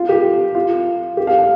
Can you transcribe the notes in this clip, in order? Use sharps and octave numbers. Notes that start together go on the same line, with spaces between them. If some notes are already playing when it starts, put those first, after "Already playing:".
Already playing: F4
G4
F4
G4
F5
F5